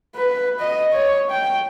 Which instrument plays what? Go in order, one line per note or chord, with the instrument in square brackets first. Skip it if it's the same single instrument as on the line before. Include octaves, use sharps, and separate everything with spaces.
[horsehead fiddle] B4
D#5
C#5
G5